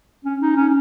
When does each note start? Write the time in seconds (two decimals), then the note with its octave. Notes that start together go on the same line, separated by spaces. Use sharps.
0.25 C#4
0.41 D#4
0.57 C#4